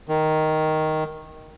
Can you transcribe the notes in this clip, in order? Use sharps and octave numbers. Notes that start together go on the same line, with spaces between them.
D#3